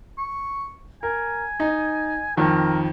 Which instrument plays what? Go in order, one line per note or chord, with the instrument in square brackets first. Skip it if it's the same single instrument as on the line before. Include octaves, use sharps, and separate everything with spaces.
[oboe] C#6
[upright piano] A#4 [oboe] G#5
[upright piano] D#4
[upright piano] F2 D#3 [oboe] A#4